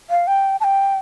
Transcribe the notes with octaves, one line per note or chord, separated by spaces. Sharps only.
F5
G5
A5
G5